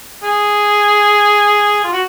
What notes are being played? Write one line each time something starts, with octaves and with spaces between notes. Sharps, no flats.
G#4
F4
F#4